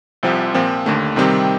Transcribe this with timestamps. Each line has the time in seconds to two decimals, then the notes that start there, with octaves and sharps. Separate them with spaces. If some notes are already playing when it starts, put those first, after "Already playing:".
0.23 C2 C3 F3 C4 G4
0.54 A#2 F3 C4
0.86 D#2 D3 A3
1.16 C3 D#3 G3 C4 G4